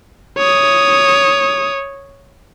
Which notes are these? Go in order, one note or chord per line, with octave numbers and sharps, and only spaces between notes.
C#5 D#6